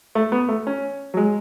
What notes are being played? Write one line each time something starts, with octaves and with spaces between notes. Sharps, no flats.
A3
B3
A3
C#4
F#3
G#3